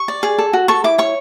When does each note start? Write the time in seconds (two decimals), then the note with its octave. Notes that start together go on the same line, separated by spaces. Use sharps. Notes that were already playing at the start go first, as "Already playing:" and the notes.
Already playing: C#6
0.08 D5
0.23 G#4
0.38 A4
0.53 F#4
0.68 A4 C#6
0.84 E4 D6
0.98 C#5 C#6